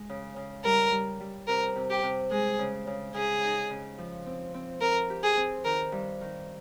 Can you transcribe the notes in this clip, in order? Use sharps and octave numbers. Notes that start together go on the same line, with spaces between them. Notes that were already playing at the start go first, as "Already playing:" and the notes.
Already playing: G#3
C#3
C#3
G3 A#4
G3
G3
C3 A#4
C3
G4
C3
G#3 G#4
C#3
C#3
C#3 G#4
D#4
C#3
F3
C4
C4
C4 A#4
G4
G#4
C4
D#3 A#4
G2
D#3